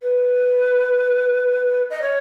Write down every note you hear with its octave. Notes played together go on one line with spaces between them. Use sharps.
B4
D#5
C#5